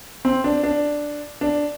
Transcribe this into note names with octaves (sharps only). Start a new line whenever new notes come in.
C4
D4
D4
D4